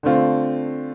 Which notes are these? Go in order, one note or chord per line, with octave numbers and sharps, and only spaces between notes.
D3 A3 C4 F4